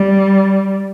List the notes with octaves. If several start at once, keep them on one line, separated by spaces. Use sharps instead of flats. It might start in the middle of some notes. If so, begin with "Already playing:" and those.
Already playing: G3